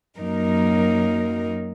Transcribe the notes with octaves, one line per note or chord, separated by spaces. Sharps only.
F#2 F#3 A#3 D#4 A#4